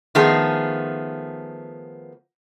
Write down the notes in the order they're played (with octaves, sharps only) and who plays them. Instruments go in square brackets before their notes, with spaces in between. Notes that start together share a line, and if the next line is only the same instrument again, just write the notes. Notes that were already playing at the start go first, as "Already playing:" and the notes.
[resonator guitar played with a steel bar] D#3 F3 A3 B3 G#4